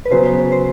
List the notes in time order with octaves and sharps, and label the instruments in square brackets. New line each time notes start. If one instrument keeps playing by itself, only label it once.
[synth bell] B4
[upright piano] C#3 F#3 B3 [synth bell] C5
[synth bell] C5